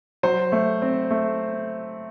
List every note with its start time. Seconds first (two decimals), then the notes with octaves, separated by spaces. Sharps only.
0.23 F#3 C5
0.52 A3
0.82 C4
1.11 A3